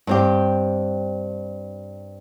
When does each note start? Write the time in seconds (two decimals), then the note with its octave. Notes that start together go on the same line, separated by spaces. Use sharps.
0.07 G2 C4 G4